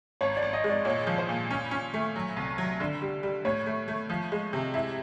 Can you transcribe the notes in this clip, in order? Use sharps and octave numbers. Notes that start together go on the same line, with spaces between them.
G#1 C#5
D5
G#1
D#5
G#3
D5
A#2 C#5
F3
C5
A#2
C#4
C#4
A3
F#3
C2
F#3
D3
G3
G3
A2 C#5
A3
A3
F3
G#3
C3
E4 E5